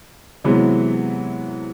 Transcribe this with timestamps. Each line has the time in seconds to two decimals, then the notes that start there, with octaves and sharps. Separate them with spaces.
0.44 C3 E3 F#3 G#3 B3